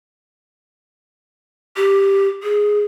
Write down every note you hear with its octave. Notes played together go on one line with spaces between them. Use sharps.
G4
G#4